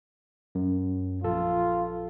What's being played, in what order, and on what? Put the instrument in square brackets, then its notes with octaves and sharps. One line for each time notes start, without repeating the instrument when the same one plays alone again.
[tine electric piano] F#2
[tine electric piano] A#1 A4 [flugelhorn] F4